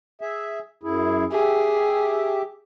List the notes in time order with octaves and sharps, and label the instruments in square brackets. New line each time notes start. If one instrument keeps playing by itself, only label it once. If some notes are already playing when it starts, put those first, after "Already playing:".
[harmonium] G#4 E5
F#2 E4 G#4
[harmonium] G4 E5 [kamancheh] G#4